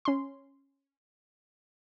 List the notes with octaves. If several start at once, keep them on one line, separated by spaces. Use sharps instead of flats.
C#4 C6